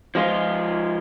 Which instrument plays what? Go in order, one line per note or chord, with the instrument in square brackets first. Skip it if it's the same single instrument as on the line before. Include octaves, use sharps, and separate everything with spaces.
[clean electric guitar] F3 G#3 F4